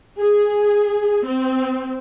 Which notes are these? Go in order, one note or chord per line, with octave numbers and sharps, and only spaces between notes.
G#4
C4